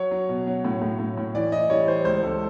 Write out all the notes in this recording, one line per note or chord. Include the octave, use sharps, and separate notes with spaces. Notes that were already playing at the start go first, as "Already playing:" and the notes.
Already playing: F#3 C#5
F#3
B2
F#3
A2
A2
A2
A2
E3 D5
E3 D#5
G3 C#5
E3 C5
C#2 C5
C#2 A4